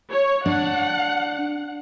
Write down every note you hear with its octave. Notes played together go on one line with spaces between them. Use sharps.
C#5
D4 F#5